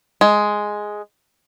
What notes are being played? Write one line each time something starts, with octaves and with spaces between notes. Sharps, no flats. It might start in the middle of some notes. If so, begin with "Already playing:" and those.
G#3